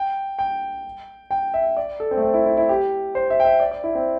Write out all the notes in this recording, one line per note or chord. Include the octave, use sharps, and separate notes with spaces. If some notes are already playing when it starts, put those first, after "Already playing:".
Already playing: G5
G5
G5
E5
D5
A4
C4
A3
C4
E4
E4
E4
G4
C5
E5
G5
E5
D5
D5
E4
C4